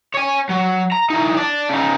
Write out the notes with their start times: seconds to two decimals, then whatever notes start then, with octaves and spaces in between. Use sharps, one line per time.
0.14 C#5 G#5
0.49 F#3
0.92 A#5
1.10 E3 D#4
1.37 D5 A5
1.69 C#3 D#4